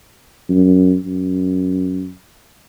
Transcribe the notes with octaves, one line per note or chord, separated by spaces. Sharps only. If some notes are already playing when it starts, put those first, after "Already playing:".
F#2
F#2